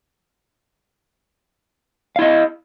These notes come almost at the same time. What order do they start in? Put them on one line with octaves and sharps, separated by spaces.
F5 E4 D#5